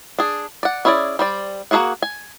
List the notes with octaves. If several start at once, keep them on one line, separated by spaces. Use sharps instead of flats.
D4 G#4
D5 F#5
C#4 E4 G#4 A4 D5
G3 C5 D5
A#3 D#4 F#4 G#4 F#5
G#5